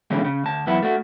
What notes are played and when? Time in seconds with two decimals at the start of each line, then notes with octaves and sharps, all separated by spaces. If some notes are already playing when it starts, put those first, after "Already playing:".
0.10 C#2 B2 D3 E3 G#3 C#4
0.25 C#3
0.43 D2 A5
0.67 F#2 E3 B3 E4
0.83 A3 F#4